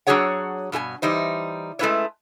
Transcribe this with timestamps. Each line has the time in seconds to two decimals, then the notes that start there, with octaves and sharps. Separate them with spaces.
0.07 F#3 D4 F#4 G#4 C#5 F#5
0.72 G2 B2 G#4 G#5
1.02 E3 G3 D#4 C5
1.79 G#3 A3 C#4 E4 B4 C#5